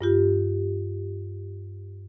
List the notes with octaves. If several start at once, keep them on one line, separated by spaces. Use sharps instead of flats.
G2 F4 G4